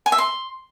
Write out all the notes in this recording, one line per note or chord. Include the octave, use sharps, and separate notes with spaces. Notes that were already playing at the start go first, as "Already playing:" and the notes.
G#5
E5
C6